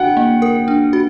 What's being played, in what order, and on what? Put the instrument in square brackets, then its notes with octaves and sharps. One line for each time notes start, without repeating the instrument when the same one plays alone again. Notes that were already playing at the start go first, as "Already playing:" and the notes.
Already playing: [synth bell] D4 F#4 [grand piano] F#5 G5
[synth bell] A#3
A#4
D4
F#4